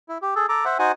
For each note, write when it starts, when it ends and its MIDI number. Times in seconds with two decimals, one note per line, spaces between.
0.09 0.18 64
0.22 0.34 67
0.36 0.46 68
0.36 0.46 69
0.49 0.65 69
0.49 0.65 82
0.49 0.65 86
0.65 0.78 72
0.65 0.78 76
0.65 0.78 78
0.79 0.92 63
0.79 0.92 66
0.79 0.92 72
0.79 0.92 78
0.79 0.92 80